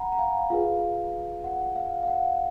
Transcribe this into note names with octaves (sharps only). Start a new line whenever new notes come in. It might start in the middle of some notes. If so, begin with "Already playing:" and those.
Already playing: F#5 G#5 A#5 B5
A#5
F5 G#5
F4 G#4 B4 F5
F#5
F5
F5
F#5